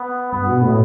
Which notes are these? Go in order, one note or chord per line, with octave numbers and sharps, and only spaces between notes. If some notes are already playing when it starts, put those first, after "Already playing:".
Already playing: B3
G2 B3
B2
A2